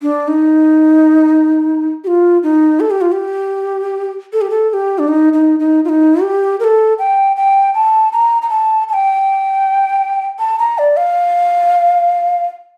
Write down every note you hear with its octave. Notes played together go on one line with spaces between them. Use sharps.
D4
D#4
G4
F4
D#4
A4
G4
F4
G4
A4
G4
A4
A4
G4
D4
D#4
D#4
D#4
F4
D#4
G4
A#4
A4
G5
G5
A5
A#5
A#5
A5
A5
G5
A5
A#5
D5
F5